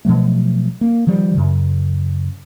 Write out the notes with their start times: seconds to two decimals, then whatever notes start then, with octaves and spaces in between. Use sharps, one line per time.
0.05 B2 F3 F#3 A3
0.81 A#3
1.07 D#3 F3 G3
1.35 F#2 C#3